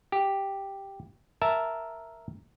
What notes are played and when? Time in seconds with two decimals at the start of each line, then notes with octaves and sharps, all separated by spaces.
0.12 G4
1.42 A#4 E5 A5